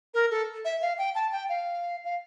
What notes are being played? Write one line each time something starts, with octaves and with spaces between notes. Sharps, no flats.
A#4
A4
E5
F5
G5
A5
G5
F5
F5